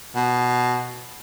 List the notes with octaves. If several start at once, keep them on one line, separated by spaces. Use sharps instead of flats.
B2